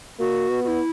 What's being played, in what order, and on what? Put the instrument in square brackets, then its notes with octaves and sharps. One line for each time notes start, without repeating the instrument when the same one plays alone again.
[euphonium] A#3 [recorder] F#4
[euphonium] B3
[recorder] F#4
E4